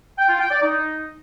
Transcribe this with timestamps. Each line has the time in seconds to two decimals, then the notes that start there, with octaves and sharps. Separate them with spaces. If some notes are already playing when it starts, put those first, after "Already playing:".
0.18 G5
0.29 F4
0.40 G5
0.51 D5
0.62 D#4